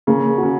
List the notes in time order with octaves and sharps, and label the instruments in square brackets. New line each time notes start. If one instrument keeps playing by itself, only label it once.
[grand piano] C#3 [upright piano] A#3
[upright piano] F#4
[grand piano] C#3